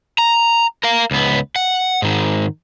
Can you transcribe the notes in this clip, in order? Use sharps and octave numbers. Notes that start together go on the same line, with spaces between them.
A#5
A#4 F5
C#2 B3
F#5
G#2 D#3